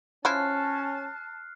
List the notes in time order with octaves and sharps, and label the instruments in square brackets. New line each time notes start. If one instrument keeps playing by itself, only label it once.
[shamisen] F3 E4 [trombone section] C#4 [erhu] A5 [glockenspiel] F6 F#6 C7